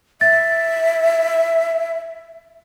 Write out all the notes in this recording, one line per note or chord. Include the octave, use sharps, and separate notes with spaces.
E5 A6